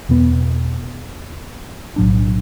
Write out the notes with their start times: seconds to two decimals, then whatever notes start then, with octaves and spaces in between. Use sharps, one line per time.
0.09 E2 B2 B3
1.96 B1 A2 F#3 D4